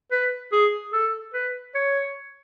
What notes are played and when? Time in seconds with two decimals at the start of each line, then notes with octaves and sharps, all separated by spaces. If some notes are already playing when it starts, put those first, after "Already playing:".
0.11 B4
0.52 G#4
0.93 A4
1.34 B4
1.75 C#5